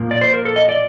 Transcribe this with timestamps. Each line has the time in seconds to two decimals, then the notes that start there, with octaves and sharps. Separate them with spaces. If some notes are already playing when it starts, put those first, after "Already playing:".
Already playing: A#2 F3 A#3
0.11 D5
0.21 C5
0.34 A#4
0.45 A4
0.56 D#5
0.69 D5